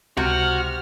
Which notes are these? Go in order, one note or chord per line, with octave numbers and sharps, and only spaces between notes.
C#2 C3 G#3 F#4 F6